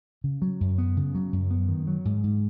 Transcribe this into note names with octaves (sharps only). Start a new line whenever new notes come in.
C#3
F#3
F#2
B3
C#3
F#3
F#2
B3
D#3
F#3
G#2
G#2